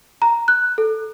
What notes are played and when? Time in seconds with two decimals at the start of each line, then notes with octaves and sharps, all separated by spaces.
0.22 A#5
0.48 F#6
0.78 A4